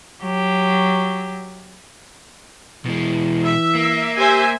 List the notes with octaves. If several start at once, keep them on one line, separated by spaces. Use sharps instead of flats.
F#3 G4
B2 E3 G#3
E5
A#3
G4 C5 E5 G#5